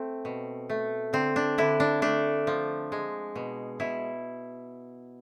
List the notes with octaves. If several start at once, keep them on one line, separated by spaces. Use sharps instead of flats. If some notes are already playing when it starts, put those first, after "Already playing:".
Already playing: A3 C4
B2
A3
D3 C4
D4
D3 E4
D4
A3 D4
F3
G#3
B2
B2 E4